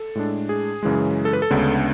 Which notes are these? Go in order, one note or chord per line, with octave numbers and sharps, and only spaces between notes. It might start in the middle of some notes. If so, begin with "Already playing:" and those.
Already playing: A4
A2 G#3 D4
G#4
F#2 C#3 E3 G#3
A4
B4
A4
D2 C#3 G#3 B3 D4